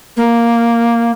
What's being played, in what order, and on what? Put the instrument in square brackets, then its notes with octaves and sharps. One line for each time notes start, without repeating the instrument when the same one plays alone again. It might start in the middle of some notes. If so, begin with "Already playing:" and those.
[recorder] A#3